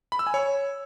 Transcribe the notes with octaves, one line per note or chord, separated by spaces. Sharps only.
B5
E6
G#5
C#5